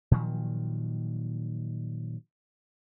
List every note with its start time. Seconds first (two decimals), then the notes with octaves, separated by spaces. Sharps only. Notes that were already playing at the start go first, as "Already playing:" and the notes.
0.11 A#2 D#3 F3 F#3